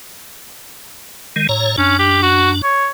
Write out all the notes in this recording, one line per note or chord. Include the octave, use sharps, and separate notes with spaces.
D#3 G#3
A2 C#5 A#5
F#2 C#4 D4
G4
F#4
C#5